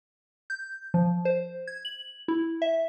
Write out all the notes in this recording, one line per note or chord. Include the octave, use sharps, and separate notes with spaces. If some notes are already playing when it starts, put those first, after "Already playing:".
G6
F3
C5
G#6
F#7
E4
E5